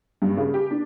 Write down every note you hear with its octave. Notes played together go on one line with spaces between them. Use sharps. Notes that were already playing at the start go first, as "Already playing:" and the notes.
G2
C#3
G4
D4